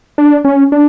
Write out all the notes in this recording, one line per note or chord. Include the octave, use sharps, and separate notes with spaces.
D4
C#4
D4